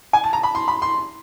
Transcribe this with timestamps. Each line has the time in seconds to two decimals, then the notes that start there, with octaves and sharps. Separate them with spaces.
0.13 G#5
0.24 A5
0.33 A#5
0.43 B5
0.55 C6
0.68 B5
0.82 C6